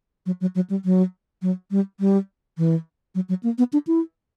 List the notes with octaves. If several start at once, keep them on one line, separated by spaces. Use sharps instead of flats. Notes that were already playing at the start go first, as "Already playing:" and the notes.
F#3
F#3
F#3
G3
F#3
F#3
G3
G3
E3
F#3
F#3
A#3
B3
D4
E4